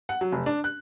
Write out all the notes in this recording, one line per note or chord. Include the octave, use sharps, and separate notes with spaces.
F#5
F#3
F1
D4
F#6